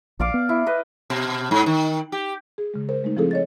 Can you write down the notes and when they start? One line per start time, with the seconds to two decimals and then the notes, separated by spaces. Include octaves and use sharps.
0.19 A#1 D5 F5 D6
0.34 B3
0.49 E4
0.66 B4 D#5
1.10 B2
1.51 G#2
1.66 D#3
2.12 G4
2.58 G#4
2.74 C#3 G#3
2.89 A#4 C5
3.04 G#3 A3 D#4
3.17 F3 C4 E4 G#4 A4
3.31 C#5 D#5 A6